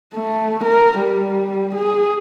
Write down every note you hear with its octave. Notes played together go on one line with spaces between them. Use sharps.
A3
A#4
G3
G#4